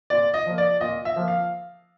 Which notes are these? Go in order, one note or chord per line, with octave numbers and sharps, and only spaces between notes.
A#2 D5
D#5
F3 A#3
D5
A#2 D#5
E5
F3 A#3
F5